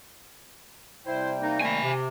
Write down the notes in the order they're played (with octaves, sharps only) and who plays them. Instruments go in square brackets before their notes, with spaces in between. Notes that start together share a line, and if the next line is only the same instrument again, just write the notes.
[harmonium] C3 G3 G5 [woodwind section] E4 C5
[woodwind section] A#3 D#4
[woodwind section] D#3 A3 A#3 [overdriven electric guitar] G#5 B5
[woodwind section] C3